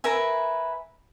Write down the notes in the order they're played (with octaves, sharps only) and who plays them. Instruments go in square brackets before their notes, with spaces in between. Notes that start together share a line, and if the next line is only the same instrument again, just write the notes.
[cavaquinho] A#4 B4 E5 G#5